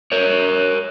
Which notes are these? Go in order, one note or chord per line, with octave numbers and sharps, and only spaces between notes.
A#4 C#5